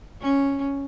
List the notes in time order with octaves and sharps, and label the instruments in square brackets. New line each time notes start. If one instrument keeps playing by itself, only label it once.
[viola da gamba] C#4